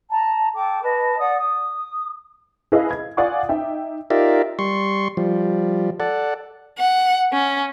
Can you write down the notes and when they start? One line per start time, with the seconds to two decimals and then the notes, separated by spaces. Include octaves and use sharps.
0.10 A5 A#5
0.54 A4 G5 D6
0.82 B4 D#5 A5
1.18 D5 F#5 D#6
1.37 D#6
2.72 E4 G#4 A4 B4 D#5 F5
2.91 G#6
3.17 F4 D5 F#5 G#5 D6 D#6
3.49 D#4 E5 G5
4.10 D#4 F4 G4 A#4 D5 E5
4.59 G3 C6 C#6
5.17 F3 G3
6.00 A4 D5 F#5
6.78 F#5
7.33 C#4